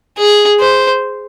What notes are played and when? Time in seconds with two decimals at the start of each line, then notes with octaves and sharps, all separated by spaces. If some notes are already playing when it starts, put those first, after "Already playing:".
0.18 G#4
0.60 C5